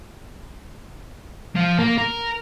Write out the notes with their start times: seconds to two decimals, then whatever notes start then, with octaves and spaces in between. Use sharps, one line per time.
1.55 F3
1.79 A#3
1.98 A#4